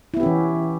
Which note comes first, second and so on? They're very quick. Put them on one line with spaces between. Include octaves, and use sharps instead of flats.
E4 B3 G4 C#4 E3